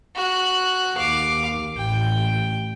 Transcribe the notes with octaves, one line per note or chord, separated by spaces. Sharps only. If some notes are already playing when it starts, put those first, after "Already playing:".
F#4 F#6
D#2 F5 D6
A1 G5